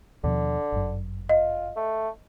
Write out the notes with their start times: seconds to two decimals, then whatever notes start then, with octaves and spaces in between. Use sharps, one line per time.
0.24 D#2 B2 D3 F3
0.72 G1 F#2
1.29 F4 D#5
1.76 A3